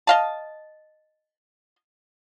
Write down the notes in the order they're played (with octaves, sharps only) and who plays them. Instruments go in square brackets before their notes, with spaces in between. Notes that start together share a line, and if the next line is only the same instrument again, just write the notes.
[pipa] D#5 F5 A5